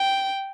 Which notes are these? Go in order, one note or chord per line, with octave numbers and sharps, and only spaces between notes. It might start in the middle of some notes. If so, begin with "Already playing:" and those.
Already playing: G5